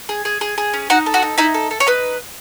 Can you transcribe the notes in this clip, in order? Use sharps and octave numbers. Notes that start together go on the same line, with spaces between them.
G#4
G#4
G#4
G#4
C#4
D#4 F#4 F#5
A4
F#4 F#5
D#4
D#4 E4 E5
A4
A4
C#5
D#4 B4